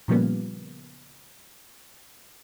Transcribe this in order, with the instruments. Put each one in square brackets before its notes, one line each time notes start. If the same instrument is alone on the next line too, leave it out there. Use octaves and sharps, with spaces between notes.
[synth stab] A#2 C#3 F3 G3 A#3 B3